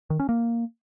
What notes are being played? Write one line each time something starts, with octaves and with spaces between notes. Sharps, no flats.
D#3
C#4
A#3